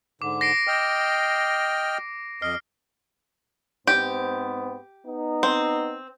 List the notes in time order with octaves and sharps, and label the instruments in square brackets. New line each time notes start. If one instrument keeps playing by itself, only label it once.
[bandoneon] G#2 D3 [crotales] D6
[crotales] A#6 C7 D7
[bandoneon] D#5 G5 F6
[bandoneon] F2 D#5 [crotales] F6 C7
[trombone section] G#2 B3 C4 [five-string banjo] G4
[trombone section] B3 D#4
[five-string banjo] C4